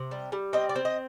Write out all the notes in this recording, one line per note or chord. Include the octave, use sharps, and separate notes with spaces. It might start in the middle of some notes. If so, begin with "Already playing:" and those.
Already playing: C3
G3
G3
C4 D#5
D5
C4
D#5